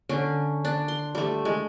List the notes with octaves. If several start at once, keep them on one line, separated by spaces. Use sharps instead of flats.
D3 C#4
D4
C6
G3 A3
G#3